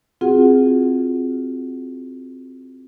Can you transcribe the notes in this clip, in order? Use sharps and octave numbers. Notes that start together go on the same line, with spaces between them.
C4 F4 F#4 G#4 F#5